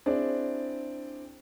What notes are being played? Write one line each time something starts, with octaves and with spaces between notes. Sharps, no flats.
C4 D4 E4 G#4 D5